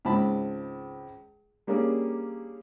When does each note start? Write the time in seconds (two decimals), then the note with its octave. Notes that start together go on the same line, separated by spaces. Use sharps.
0.05 C#2 G#2 C4 A5 B5
1.67 G3 A#3 C#4 D4 G#4